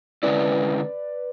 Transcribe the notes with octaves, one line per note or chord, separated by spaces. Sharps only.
D3 G#3 C#4 E4 B4 D5